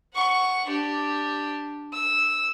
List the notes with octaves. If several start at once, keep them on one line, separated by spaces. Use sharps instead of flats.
F#5 C#6
D4 G4
E6